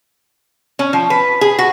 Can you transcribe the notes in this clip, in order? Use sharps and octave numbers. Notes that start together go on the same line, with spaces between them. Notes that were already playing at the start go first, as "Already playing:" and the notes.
C#4
F3
B4
G#4
F#4